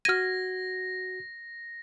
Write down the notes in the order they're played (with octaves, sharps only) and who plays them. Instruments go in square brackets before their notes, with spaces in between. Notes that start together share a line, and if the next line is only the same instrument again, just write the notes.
[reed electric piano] F#4 G#6 [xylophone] F6 D#7 [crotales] A#6